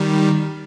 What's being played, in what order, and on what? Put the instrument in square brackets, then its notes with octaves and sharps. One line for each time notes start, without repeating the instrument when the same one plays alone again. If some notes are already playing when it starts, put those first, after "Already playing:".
Already playing: [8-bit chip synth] D#3 G3